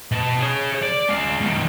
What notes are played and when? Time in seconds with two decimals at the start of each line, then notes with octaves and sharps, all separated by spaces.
0.11 B2 A5
0.39 G#4 C#5
0.82 D5
1.08 G#3 F5
1.41 B2 D#3